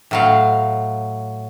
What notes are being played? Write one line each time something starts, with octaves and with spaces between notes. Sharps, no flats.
A2 F#3 F5